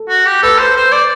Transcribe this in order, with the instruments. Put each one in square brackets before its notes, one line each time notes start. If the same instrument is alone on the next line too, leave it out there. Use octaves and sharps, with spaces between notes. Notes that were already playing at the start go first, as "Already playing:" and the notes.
Already playing: [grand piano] A4
[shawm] F#4
G4
[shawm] A4 [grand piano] B4
[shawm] C5
C5
D5